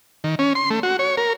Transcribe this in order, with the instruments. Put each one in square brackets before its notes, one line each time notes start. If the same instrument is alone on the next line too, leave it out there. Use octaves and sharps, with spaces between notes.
[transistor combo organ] D#3
C#4
C6
A3
F#4
C#5
A#4